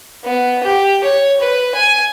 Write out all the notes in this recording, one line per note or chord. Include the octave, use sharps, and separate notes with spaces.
B3
G4
C#5
B4
G#5